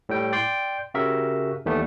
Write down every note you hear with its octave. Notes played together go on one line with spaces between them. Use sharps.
A2 G3 G5
D5 G5 C6
C#3 F#4 G4 A#4 E5
D#2 E3 G3 A3 B3